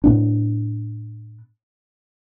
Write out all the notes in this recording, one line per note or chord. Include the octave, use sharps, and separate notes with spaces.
A2 B3 D4